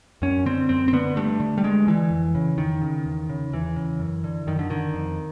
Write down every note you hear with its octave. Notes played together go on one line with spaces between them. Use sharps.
F#2 C#4
D3 C4
F#2 C4
C4
D3 B3
G2 A3
D3
G3
G2 G#3
D3 E3
F2
C#3
F2 D#3
C#3
E2
C#3
E2 E3
C#3
F#2
D3
F#2 D#3
D3
D3 D#3
F2